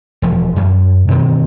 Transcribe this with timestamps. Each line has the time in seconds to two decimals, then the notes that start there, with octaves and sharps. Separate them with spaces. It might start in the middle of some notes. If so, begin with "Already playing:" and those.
0.22 E1 F3
0.56 F#2
1.08 D2 B2 D#3 C4